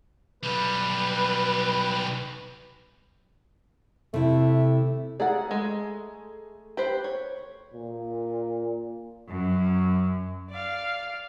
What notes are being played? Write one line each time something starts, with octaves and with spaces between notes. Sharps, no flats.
B1 G3 B4
C3 A3 E4
A3 G#4 D5 F#5 A#5
G#3
G4 B4 C5
C#5
A#2
F#2
D5 F5